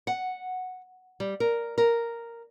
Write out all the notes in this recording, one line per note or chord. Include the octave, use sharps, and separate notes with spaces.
F#5
G3
A#4
A#4